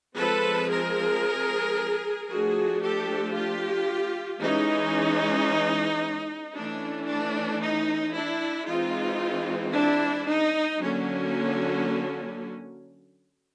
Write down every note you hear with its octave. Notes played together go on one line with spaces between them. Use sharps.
F3 G#3 C4 A4 B4
G#4 A#4
F3 A3 D4 F#4 G#4
G4 A4
F4 G4
E3 G#3 C#4 D#4
E3 A3 C#4 D4
D4
D#4
D4 E4
E3 G#3 C4 D#4 F4
D4 E4
D#4
D3 F#3 A#3 C#4